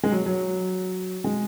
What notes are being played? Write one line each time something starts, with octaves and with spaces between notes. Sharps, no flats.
G#3
F#3
F#3
G#3